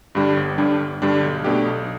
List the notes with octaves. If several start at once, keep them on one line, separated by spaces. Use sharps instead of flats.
G2 D3 G3 D4
G1
G2 D3 G3 D4
G1
G2 D3 G3 D4
B1
B2 A3 D4 G4
B1